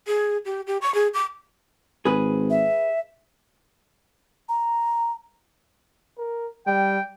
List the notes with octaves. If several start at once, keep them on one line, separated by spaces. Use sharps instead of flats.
G#4
G4
G4
C#6
G#4
D6
G#1 G#4 B4
E5
A#5
A#4
G3 G5